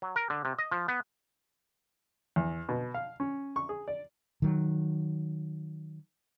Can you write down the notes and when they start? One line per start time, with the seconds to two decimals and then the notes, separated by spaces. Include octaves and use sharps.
0.02 F#3
0.16 A#4
0.30 D3
0.45 C3
0.59 D#5
0.71 F3
0.88 B3
2.36 E2
2.69 B2
2.94 F5
3.20 C#4
3.56 C#6
3.69 G#4
3.88 D5
4.42 D#3 F#3